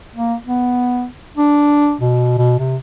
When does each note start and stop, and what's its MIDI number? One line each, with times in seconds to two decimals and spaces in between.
0.15 0.35 58
0.45 1.06 59
1.37 1.95 62
2.01 2.35 47
2.38 2.57 47
2.59 2.76 48